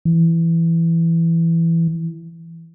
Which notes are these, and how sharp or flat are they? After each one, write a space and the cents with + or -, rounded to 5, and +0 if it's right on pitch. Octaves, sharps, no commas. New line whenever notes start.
E3 +10